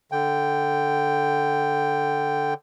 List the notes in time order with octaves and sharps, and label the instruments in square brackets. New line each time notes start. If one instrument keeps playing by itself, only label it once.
[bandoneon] D3 G5